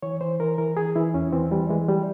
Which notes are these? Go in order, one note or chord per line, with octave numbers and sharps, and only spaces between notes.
E3 C#5
E3 C5
E3 A#4
E3 A#4
E3 G#4
E3 E4
E2 C#4
E3 C4
E3 G3
E3 G#3
G3